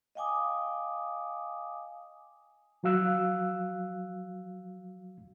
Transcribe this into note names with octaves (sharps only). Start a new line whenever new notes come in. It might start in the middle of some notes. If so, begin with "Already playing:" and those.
D#5 F5 G5 G#5 D6 D#6
F3 F#3 F#4 F5 E6 F#6